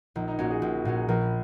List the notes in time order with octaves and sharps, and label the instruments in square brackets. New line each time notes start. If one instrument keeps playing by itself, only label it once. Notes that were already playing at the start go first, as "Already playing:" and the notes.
[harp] A#1 [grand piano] D#4
[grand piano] D#4
[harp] A#2 A#3 C#4 [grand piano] F#4
[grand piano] G#4
[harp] A#1
[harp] A#2 A#3 C#4 [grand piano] F#4
[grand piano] G#4
[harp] A#1 [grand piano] A#4